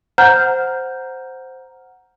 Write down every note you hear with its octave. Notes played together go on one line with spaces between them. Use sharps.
C5 F#5 A#5 F6 G6